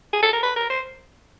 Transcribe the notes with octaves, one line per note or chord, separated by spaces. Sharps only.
G#4
A4
A#4
B4
A#4
C5